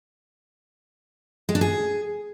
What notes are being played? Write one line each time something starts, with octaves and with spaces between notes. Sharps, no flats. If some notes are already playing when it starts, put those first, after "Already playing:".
G#3
D4
G#4